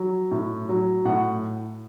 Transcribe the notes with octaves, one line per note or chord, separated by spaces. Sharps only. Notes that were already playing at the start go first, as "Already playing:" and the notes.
Already playing: F#3
A2
F#3
A2 F#5